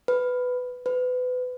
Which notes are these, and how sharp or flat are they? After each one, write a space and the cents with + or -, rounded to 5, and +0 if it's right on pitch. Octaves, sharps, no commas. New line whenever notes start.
B4 +10
B4 +25